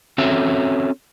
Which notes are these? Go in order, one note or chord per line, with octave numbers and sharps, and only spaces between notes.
C4 C#4 F#4 A4 C#5 E5